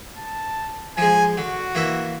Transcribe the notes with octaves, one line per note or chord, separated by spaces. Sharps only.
A5
F3 G#3 G#5
D3 F#4
E3 A#3 E5